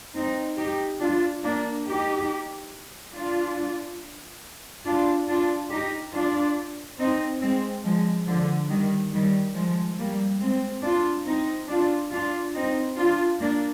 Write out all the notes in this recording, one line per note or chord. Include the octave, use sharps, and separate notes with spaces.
C4 D#4
D#4 G4
D4 F4
A#3 D4
D#4 G4
D4 F4
D4 F4
D4 F4
D#4 G4
D4 F4
C4 D#4
G#3 C4
F3 G#3
D3 F3
D#3 G3
D#3 G3
F3 G#3
G3 A#3
G#3 C4
D4 F4
C4 D#4
D4 F4
D4 F4
C4 D#4
D4 F4
A#3 D4